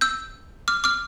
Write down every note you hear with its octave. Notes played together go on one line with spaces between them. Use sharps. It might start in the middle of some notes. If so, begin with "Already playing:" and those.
E6 G6
D6 F6
D6 F6